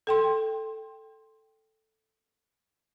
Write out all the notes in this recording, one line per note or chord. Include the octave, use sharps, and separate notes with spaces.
A4 G5 C6